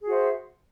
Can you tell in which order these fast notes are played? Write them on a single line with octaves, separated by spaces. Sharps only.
G#4 F#4 C5 E5